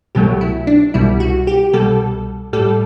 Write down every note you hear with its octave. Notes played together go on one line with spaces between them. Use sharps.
C2 B2 F#3 A3 G4
E4
D4
C2 B2 G3 E4
F#4
G4
C2 B2 G3 A4
A2 G3 A4